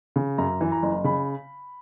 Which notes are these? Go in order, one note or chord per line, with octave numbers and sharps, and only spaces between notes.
C#3
F#2 A#5
E3
A#5
F#1
C#3 B5